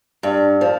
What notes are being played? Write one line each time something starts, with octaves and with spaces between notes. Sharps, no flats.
G2
F3